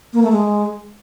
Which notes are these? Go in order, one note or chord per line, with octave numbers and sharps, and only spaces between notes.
A#3
A3
G#3